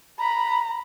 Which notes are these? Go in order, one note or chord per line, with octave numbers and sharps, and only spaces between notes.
A#5 B5